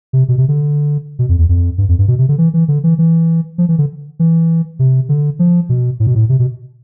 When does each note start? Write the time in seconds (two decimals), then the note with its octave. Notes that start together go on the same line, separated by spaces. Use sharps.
0.13 C3
0.28 B2
0.38 C3
0.48 D3
1.19 B2
1.29 F2
1.38 E2
1.49 F2
1.78 G2
1.89 F2
1.99 G2
2.08 B2
2.19 C3
2.29 D3
2.38 E3
2.54 E3
2.68 D3
2.84 E3
2.99 E3
3.58 F3
3.69 E3
3.78 D3
4.19 E3
4.79 C3
5.09 D3
5.39 F3
5.69 B2
6.00 A2
6.07 B2
6.15 A2
6.29 C3
6.39 B2